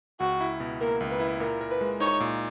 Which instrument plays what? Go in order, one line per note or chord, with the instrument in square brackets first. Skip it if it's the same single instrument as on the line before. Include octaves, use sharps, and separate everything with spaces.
[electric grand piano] C#2 [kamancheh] F#4
[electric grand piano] E4
B2
[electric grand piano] A#3 [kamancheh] A#4
[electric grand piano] C#2
[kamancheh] B4
[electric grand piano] E4
[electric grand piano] A#2 [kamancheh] A#4
[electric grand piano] A#4
[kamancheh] B4
[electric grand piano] G#3
[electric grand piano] D#4 [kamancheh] C#5
[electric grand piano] A#2